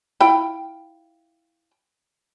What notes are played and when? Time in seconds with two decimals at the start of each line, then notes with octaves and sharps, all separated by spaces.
0.20 E4 F4 G5